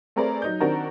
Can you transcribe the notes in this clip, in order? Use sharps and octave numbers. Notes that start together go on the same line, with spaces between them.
A3 C4 G#4 A#4 B4 D5
F#3 D#4 G6
D#3 C4 D4 F#4 A#4